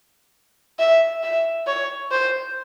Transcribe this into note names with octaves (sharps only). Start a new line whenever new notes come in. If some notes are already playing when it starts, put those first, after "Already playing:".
E5
E5
C#5
C5